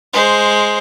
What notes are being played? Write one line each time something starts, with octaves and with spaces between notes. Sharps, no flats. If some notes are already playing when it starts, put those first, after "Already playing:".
G#3 C5